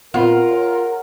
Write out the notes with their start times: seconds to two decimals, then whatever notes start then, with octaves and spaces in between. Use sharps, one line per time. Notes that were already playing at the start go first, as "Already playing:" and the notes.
0.14 A#2 B3 C4 F4 A#4 F#5
0.50 G#4 C#5